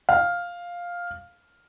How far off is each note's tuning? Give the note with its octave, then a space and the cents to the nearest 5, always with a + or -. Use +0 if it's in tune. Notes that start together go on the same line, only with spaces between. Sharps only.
F5 +5